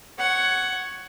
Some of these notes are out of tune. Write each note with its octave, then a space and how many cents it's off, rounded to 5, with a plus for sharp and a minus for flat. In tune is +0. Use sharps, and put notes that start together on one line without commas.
C#5 +0 F#5 +10